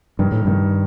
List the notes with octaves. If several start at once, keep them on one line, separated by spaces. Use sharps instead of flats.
G2 D#3
A2
G2 D#3